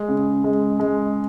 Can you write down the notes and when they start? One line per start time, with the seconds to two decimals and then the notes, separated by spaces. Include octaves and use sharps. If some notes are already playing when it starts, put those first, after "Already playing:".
Already playing: G#3
0.09 C#3
0.44 G#3
0.80 G#3